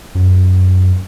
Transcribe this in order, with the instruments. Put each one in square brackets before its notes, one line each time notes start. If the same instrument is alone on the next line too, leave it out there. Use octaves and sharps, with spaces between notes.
[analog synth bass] F#2